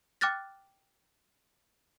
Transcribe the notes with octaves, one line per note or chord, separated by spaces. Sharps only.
G5 D6 F6 F#6 A6 A#6